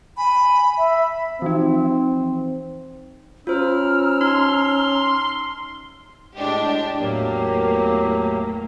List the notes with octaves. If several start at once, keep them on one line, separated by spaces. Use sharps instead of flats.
G#5 B5
E5
B5
E3 F3 C4 D#4
C#4 F4 C5 A#5 E6 F6
D#4 C6
A2 G#3 D4 G4
E2 A2 F#3 A#3 G4